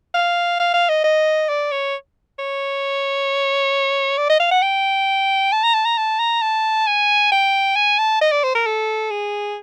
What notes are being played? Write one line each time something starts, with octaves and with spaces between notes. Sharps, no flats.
F5
F5
F5
D#5
D#5
D5
C#5
C#5
D5
D#5
F5
F#5
G5
A5
A#5
A5
A#5
A5
A#5
A5
G#5
G5
G#5
A5
D#5
D5
C5
A#4
A4
G#4